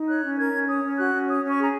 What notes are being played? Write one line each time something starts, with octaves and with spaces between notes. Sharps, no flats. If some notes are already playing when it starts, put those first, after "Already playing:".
Already playing: D#4
C#5 F#6
C#4
A#4 G#6
C#4
C#5 D#6
C#4
F#4 F#6
C#4
C#5 D#6
C#4
C#6
G#4 A#5